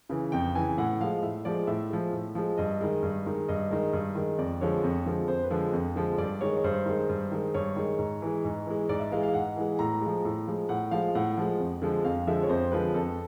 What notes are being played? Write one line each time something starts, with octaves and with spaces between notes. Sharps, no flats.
C#3 E3
F2 G5
C#3 E3 G#5
A2 F#5
F3 G#3 F5
A2 E5
F3 G#3 D5
A2 E5
F3 G#3
A2
F3 G#3
G2 D#5
D#3 G#3
G2
D#3 G#3
G2 D#5
D#3 G#3
G2
D#3 G#3
F2 D5
D3 F3 G#3 C#5
F2
D3 F3 G#3
F2 C5
B4
D3 F3 G#3
F2
D3 F3 G#3
G2 D5
D#3 G#3 C#5
C#5
G2 C5
D#3 G#3
G2
D#3 G#3
G2 C#5
D#3 G#3
G#2
E3 G#3
G#2
E3 G#3
G#2 D5
E5
E3 G#3 F5
F5
G#2 F#5
E3 G#3
A2 A#5
F3 G#3
A2
F3 G#3
A2 F#5
F3 G#3 F5
A2 F#5
F3 G#3
F2
D3 F3 G#3
F2 F5
D3 F3 G#3 E5
C#5
F2 C5
D3 F3 G#3 B4
F2 A4